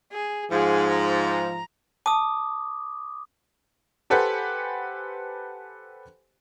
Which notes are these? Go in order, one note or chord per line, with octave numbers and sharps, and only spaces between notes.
G#4
G#2 F3 G#4
A#5
A5 D6 D#6
G4 A4 B4 C5 F#5 G#5